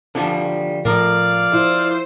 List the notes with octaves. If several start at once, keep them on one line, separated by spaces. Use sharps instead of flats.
D3 F3 G3
A2 F3 A#4 D5 F5
E4 C5